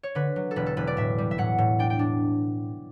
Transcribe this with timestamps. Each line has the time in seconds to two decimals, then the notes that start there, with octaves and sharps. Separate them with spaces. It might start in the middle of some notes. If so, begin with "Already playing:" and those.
0.03 C#5
0.15 D3 B4
0.36 F#3
0.51 A4
0.56 E1 B4
0.66 A4
0.77 E1 B4
0.87 D5
0.97 A2 E5
1.18 G3
1.31 E5
1.38 A2 F#5
1.58 A2
1.79 D4 G5
1.90 G5
1.99 D4